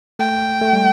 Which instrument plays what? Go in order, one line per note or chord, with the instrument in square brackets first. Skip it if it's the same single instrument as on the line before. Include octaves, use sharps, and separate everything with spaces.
[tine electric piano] A3 [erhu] G5
[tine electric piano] A3
G3